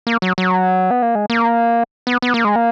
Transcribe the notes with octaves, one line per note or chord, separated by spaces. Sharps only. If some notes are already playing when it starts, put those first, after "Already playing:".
A#3
F#3
F#3
B3
A#3
G#3
A#3
B3
B3
A#3
G#3
A#3